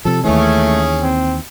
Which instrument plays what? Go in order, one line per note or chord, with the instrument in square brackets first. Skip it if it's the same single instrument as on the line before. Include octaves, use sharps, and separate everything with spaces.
[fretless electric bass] C3 F3 [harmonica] A4
[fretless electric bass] D#2 E3 [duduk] A3 [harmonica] C#4 G#4
[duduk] C4